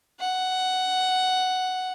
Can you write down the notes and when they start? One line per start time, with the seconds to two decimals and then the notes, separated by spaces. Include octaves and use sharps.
0.20 F#5